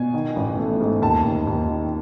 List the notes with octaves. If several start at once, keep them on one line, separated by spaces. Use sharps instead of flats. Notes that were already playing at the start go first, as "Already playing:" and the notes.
Already playing: B2 G#5
D#3
A1
A3
G#2
D#2 A5
D#2
D#2
D#3